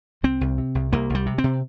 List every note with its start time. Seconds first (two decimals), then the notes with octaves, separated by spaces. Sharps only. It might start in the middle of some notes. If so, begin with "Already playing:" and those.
0.23 C2 C4
0.41 C2
0.58 C3
0.75 C2
0.93 C2 A#3
1.10 C2 G3
1.26 C3
1.38 C4
1.44 C3